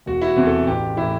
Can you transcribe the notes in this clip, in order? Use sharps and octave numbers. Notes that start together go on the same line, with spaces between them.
E1 F#4
E4
F#4
E2 C3 E3
A4
A1 G4
A2 E3 E4